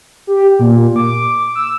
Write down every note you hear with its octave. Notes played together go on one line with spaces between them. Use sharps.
G4
A#2
D6
E6